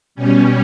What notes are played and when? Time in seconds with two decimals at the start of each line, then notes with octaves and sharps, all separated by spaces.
0.15 B2 G3 C#4